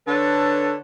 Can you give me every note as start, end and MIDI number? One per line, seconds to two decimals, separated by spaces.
0.06 0.75 50
0.06 0.75 69
0.06 0.75 71
0.06 0.75 73